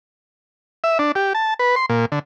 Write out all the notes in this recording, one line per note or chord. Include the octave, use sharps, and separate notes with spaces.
E5
D4
G4
A5
B4
C6
A#2
D3